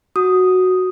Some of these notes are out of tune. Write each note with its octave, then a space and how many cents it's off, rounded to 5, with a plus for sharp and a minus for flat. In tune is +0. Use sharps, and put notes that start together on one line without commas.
F#4 +0 D#6 +0